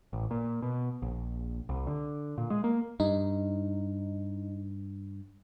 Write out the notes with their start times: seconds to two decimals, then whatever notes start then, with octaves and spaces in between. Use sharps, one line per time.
0.13 A1
0.31 A#2
0.62 B2
1.02 A#1
1.69 C2
1.87 D3
2.38 A#2
2.50 G#3
2.64 A#3
3.00 G2 D#4